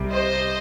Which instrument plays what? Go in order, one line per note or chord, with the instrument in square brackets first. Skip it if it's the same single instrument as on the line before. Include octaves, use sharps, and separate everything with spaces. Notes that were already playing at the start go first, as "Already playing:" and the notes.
Already playing: [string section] C2 C3 G3
C5 D#5